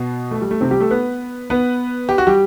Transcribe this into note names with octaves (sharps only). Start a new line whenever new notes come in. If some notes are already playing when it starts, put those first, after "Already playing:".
Already playing: B2 B3
A3
G3
A3
C3 C4
G3 G4
A3 A4
B3 B4
B3 B4
G4
F#4
G3 G4